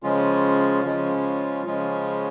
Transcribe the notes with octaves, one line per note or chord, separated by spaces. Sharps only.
C#3 F3 G#3 C#4 F4
C#3 F3 G#3 C#4 F4
C#3 F3 G#3 C#4 F4